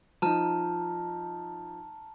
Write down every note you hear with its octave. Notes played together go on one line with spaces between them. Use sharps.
F3 D#4 A5 A#5 F6